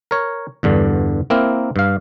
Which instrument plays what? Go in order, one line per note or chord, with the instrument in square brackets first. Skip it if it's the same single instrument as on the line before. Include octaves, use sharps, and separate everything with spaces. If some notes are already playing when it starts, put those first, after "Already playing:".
[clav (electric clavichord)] A#4 C#5
E2 G2 D3
A#3 C4 E4 A#4
G2 F5